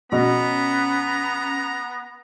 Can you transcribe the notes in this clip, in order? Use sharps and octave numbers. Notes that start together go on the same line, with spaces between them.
B2 B3 C#4 A#5